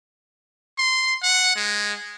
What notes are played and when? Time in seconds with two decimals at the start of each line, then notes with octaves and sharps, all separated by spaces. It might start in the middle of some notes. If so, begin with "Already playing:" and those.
0.78 C6
1.22 F#5
1.56 G#3